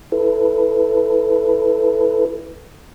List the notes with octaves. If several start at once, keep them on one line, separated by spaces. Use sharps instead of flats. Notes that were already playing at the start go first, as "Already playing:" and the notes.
E4 A4 B4